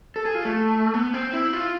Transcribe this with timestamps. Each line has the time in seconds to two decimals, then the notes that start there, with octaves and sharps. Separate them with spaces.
0.16 A4
0.25 G#4
0.35 F4
0.45 A3
0.94 B3
1.14 C4
1.33 E4
1.53 F4